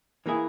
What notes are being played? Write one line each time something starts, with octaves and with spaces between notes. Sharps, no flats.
E3 A#3 E4 G#4